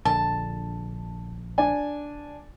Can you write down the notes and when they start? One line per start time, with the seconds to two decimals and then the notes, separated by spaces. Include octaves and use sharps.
0.05 A#1 D3 A5
1.58 D4 G#5